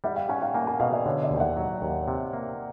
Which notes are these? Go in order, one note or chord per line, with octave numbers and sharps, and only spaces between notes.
G3 E5 F#5
F5 G5
C#4 F#5 G#5
F5 G5
A#3 F#5 G#5
F#5 G#5
B2 D#5 F5
D5 E5
D3 C#5 D#5
D5 E5
D#2
G5
E5 F#5
F#3
D#2
C3
A#3